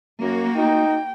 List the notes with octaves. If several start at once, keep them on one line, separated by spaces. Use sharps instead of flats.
F#2 A#3 F#4
D#4 G5